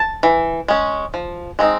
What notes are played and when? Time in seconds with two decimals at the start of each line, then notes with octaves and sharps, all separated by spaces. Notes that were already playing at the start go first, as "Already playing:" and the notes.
Already playing: A5
0.23 E3
0.68 G#3 C#4
1.14 F3
1.59 G#3 C4 D#4